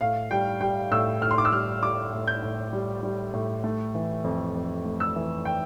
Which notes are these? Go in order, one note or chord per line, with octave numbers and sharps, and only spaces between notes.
A2 F5
G3 G5
G3 G5
A2 E6
A2 F6
C6
D6
E6
G3 F6
G3 D6
A2
G6
A2
G3
G3
A2
A3
E3
F2
F2
A3
E6
E3
G5